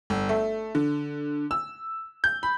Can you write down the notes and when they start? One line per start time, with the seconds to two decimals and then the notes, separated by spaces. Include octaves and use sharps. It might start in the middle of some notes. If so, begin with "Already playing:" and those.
0.10 G1
0.29 A3
0.75 D3
1.51 E6
2.24 G6
2.43 B5